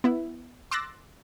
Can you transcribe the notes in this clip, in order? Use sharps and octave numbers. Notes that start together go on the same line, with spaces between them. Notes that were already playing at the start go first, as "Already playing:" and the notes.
B3 E4
C6 D6 E6 F#6 A6 A#6